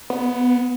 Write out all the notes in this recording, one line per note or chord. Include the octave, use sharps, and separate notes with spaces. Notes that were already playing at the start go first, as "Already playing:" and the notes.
B3